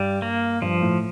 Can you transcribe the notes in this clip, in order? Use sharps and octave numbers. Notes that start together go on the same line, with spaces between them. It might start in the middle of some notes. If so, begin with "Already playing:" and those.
Already playing: G2 G3
A#3
G2 F3
A2